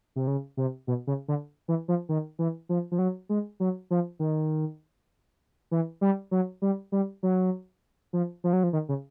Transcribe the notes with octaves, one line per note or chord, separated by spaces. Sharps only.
C3
C#3
C3
B2
C#3
D3
E3
F3
D#3
E3
F3
F3
F#3
G#3
F#3
F3
D#3
E3
G3
F#3
G3
G3
F#3
F3
F3
F#3
F3
D#3
C#3